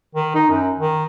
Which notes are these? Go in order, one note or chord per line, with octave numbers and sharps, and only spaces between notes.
D#3
D#4
F#2
D#3